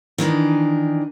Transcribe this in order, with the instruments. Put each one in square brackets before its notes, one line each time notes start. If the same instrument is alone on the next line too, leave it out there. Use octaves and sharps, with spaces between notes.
[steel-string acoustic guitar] D#3 E3 D4 D#4